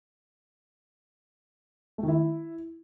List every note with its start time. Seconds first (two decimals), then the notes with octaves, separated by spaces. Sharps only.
1.98 A3
2.03 D#3
2.08 E4